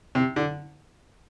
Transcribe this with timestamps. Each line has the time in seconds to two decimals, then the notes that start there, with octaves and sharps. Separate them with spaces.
0.15 C3
0.36 D3